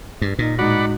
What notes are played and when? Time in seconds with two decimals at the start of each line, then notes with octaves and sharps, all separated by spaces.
0.21 G2
0.39 A#2 D#4
0.59 A2 G#3 D#4 F#4 D5 F#5 B5